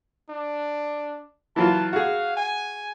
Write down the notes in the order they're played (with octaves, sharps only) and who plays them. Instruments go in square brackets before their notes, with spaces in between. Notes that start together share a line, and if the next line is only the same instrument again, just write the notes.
[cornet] D4
[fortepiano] E3 F#3 F4 [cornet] A5
[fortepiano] F#4 G#4 [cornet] F5
[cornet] G#5